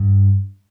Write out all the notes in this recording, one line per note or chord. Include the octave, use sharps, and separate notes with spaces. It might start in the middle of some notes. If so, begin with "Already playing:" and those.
Already playing: G2